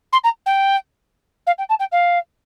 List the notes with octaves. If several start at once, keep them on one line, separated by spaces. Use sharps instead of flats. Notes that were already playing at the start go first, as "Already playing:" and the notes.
C6
A#5
G5
F5
G5
A5
G5
F5